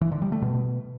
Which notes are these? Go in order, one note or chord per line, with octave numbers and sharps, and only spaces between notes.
E3
D3
G3
A3
B2